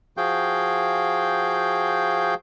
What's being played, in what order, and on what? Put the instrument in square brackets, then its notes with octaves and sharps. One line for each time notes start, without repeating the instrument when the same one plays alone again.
[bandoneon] F3 F#4 G#4 F5 G5 G6